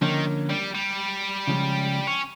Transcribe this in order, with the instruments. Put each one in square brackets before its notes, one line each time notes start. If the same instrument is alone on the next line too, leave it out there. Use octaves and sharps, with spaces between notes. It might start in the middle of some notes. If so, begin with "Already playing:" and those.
[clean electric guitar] D3 F3 A#3 C#4 [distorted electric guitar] D#3
[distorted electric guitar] G3
G3
[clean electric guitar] C#3 F3 G#3 C#4
[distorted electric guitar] C#4